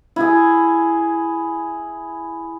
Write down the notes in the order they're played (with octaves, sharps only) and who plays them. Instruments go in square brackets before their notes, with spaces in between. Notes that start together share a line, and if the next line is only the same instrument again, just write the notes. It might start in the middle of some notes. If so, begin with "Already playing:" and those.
[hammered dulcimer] E4 G#4